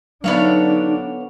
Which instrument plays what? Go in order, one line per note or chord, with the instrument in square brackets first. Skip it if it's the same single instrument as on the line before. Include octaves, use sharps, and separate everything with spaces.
[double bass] D3 D4 [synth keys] F#3 D5 [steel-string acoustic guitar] B3 C#5 F5 [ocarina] D#4